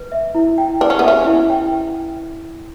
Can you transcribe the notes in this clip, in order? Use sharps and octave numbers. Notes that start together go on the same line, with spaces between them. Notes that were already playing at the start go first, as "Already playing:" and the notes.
Already playing: B4
E5
E4
G5
D4 B4
C#4
B3
C#4 E5
E4
G5